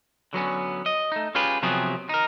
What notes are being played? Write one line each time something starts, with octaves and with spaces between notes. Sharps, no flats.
D3 F#3 B3 C#4
D#5
A3 D#4
C#4 F4 G4 G#4 B4
C3 F3 F#3 B3 G4 G#4
D#4 A#4